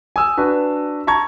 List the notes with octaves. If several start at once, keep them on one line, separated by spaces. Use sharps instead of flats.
G#5 D#6 E6
D4 F#4 B4
A5 A#5 C#6 G#6